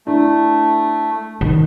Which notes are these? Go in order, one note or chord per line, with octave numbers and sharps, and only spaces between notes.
A3 D4 E4 D5
D#3